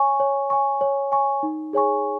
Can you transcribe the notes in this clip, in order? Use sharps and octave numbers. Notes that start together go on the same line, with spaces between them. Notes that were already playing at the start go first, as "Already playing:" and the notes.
Already playing: C#5 G#5 C#6
C#5
G#5 C#6
C#5
G#5 C#6
D#4
G#4 C#5 G#5 C#6